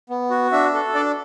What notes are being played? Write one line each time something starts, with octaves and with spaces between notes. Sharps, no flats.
B3
F#4
D4 E5
A4
D4 D5